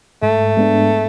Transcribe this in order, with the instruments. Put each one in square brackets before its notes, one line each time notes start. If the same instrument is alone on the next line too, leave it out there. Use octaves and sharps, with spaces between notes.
[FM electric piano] G#2 [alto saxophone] A3
[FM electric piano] G#3 B3 D4